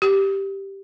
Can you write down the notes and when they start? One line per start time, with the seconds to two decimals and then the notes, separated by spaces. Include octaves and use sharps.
0.02 G4